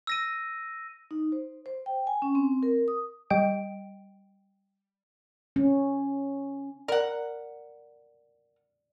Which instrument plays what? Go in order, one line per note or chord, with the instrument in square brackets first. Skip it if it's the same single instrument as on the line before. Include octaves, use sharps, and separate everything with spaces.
[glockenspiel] E6 A#6 D#7
[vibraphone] D#4
C5
C5
G5
G#5
C#4
C4
A#4
D#6
[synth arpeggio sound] G3 D#5 G5 D7
[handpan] C#4
[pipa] A#4 F#5 [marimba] D5